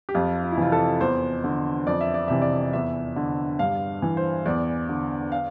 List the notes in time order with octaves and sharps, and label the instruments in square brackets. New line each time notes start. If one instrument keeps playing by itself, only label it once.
[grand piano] G4
F2 F4
F4
E4
C3 E3 F4
A4
E2 C5
D3
F2 D5
E5
D5
C3 E3 E5
D5
E2 E5
D3
G2 F5
E3
C5
E2 D5
D3
F5